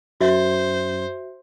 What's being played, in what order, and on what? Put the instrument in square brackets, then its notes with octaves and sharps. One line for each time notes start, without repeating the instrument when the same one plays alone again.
[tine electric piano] F#2 [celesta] F#4 E5 [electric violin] C5